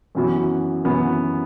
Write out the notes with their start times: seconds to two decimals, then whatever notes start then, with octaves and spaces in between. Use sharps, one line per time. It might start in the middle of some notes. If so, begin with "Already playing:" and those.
0.15 F#2 E3 B3 F#4
0.84 F#2 E3 B3 F#4